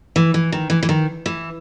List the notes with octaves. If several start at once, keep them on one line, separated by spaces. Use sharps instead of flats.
E3
E3
D#3
E3
E3
D#3
E3